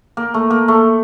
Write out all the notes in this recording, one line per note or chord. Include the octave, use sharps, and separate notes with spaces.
A#3
A3
A#3
A3